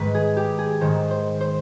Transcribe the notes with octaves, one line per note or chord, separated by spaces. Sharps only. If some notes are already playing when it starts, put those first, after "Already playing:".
Already playing: G#2 D#3 B4
G#4
G4
G#4
G#2 D#3 C5
C5
C5